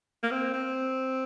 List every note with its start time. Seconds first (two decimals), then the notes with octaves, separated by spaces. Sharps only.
0.23 A#3
0.31 C4
0.53 C4